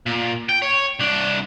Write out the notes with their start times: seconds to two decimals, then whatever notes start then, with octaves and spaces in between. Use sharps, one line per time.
0.06 A#2
0.49 G5
0.62 C#5
1.00 C2 D4